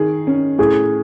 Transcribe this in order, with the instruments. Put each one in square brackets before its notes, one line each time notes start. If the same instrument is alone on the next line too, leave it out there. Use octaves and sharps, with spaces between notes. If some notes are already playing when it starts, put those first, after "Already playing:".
Already playing: [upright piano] D#3 G#4
C#4
[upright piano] A2 [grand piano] G#4